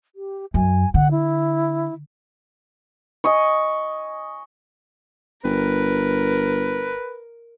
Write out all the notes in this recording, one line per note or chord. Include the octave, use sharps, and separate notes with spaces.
G4
F#2 G#5
D3 F#5
E4
D#5 G#5 C#6
G1 A#4 B4